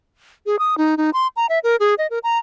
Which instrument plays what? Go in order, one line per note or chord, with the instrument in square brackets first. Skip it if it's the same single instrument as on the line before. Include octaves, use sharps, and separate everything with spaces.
[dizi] G#4
D#6
D#4
D#4
C6
A#5
E5
A#4
G#4
D#5
A#4
A#5